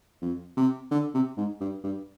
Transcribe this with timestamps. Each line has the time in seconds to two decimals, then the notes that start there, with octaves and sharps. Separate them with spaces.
0.22 F2
0.57 C3
0.91 D3
1.14 C3
1.37 G#2
1.61 G2
1.84 G2